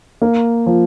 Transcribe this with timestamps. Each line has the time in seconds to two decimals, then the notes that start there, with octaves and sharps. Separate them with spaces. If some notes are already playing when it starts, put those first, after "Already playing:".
0.22 A#3
0.66 F3